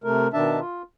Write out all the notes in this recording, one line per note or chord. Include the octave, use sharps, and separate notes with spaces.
C3 A3 A#4
B2 D#3 D4 E5 A5
F4